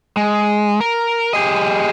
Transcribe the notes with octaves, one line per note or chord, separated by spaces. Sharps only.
G#3
A#4
G4 G#4 D#5